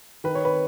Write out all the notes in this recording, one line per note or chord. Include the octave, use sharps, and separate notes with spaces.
D#3 B4
C#5
B4